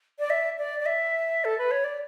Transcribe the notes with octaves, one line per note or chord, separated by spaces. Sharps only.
D5
E5
D5
D5
E5
A4
B4
C#5
D5